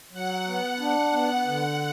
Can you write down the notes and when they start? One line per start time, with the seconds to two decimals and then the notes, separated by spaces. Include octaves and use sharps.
0.13 F#3 F#5
0.47 B3
0.80 D4 F#5
1.13 B3
1.47 D3